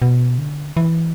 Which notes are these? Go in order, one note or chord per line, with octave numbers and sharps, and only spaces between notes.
B2
D3
E3